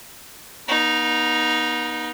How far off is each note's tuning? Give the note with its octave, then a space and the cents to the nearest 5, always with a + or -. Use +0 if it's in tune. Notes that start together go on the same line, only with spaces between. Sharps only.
B3 -40 D#4 +0